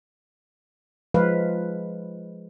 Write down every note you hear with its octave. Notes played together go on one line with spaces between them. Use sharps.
F3 G#3 B4 F5